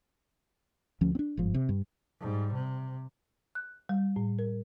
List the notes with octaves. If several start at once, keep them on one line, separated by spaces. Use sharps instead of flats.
D2 F3 C#4
C4 D4
G1 G#2 F3
C3
G2
G#2 G3
C3
F#6
G3
A2
A#4